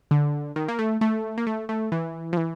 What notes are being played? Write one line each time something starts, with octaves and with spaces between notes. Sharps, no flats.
D3
D#3
A#3
A3
A3
A#3
A3
A3
E3
F3
E3